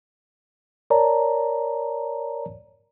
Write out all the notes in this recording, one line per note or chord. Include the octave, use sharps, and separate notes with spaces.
A#4 C#5 D5 A5 A#5